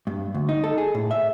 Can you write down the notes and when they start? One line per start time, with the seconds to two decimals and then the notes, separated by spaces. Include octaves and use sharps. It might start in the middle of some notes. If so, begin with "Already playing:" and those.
0.07 G2
0.34 D2
0.49 D#4
0.64 A4
0.78 G#4
0.95 A2
1.11 E5